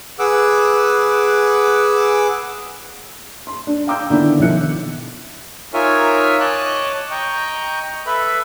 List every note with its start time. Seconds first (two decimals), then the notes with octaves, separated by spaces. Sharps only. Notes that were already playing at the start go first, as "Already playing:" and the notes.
0.19 G#4 B4 F#5 D6 E6
3.47 C6
3.67 D4
3.87 F5 G5 A#5 D6 E6 G6
4.10 D3 D#3 B3 D4 E4
4.39 B1 D#3 F3 E5 F#6 C#7
5.74 D#4 F4 A#4 C#5 E5 G#5
6.40 C#5 D#5 A5 D6 F#6
7.11 D#5 G5 A#5 C#6
8.06 A4 B4 E5 B5